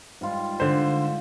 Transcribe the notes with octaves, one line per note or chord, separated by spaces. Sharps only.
G#2 G3 F4
D3 C5